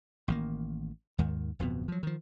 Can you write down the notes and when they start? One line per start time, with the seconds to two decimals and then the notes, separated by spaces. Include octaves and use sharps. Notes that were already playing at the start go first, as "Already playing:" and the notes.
0.28 A1 D#3 A#3
1.18 D#2 G#2 D#3
1.59 D1 F2 B2 B3
1.88 F3 F#3
2.03 D#3 F3